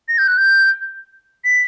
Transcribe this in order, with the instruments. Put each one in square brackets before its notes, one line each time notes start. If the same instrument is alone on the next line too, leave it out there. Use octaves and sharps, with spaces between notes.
[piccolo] A#6
G6
F#6
G6
B6